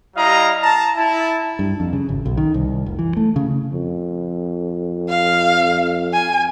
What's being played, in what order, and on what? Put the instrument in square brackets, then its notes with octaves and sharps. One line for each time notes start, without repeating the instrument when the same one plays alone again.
[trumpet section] G3 E4 D#5 F5 A#5
A5 A#5
E4 A5
[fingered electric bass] G2
F2
C#3
G#1
B1
D#3
C2
F1
E3
A3
C#3
[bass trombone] F2
[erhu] F5
G#5